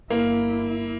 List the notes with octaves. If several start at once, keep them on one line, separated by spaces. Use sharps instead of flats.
G1 A#3 E4